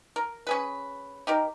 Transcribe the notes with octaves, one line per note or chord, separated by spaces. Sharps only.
A#4
C#4 G#4 B4
D#4 G4 A#4